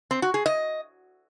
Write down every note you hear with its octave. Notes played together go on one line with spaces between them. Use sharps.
C4
F#4
G#4
D#5